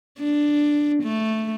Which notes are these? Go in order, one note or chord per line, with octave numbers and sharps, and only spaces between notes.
D4
A3